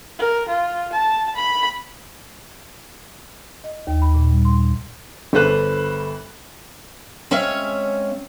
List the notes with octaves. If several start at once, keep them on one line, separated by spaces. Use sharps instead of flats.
A#4
F4
A5
B5
D#5
D#2
B5
A#2
G3
C6
G1 A4 B4 C5 F#6
G#3 C4 C#4 C#5 E5 F5